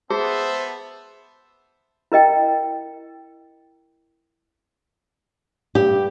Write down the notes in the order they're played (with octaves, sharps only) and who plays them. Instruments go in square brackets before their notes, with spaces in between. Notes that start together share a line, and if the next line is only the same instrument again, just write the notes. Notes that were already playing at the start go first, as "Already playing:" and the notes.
[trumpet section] B3 E5 [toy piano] G#4 [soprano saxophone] C5 [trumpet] A5
[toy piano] E4 A#4 D#5 G5
[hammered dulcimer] G2 [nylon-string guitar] G4